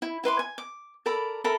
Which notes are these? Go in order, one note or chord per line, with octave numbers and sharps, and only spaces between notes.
E4
E4 B4 C6 D6
G#5
D6
A4 A#4 D5 B5
A4 A#4 E5 B5